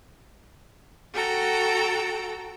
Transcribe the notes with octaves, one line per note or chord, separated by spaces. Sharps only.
F#4 A4 G5 A#5